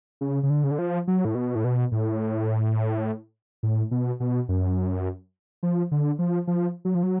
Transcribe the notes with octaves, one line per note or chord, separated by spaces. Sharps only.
C#3
C#3
D3
C#3
D3
F3
F#3
A2
B2
A2
B2
A2
A2
B2
B2
F#2
F3
D3
F3
F3
F#3
F3
F#3